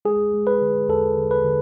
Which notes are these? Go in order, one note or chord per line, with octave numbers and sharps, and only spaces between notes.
G#3 G#4
G#3
B4
D3
E2 A4
D3
B4
D3